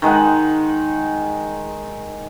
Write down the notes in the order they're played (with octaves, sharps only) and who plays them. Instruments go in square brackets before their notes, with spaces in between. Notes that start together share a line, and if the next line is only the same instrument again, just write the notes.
[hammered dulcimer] D#3 G#3 D#4 F#5